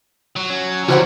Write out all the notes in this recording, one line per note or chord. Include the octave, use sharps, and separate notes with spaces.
F#3
C#4
C#3 E3 G3 F#4 A#4 C5 F#5